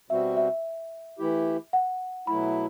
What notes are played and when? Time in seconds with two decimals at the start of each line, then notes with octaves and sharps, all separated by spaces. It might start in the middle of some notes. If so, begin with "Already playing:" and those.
0.10 B2 G3 C4 F#4 E5
0.37 E5
1.19 E3 A3 E4 G4
1.73 F#5
2.27 B2 F#3 A3 E4 B5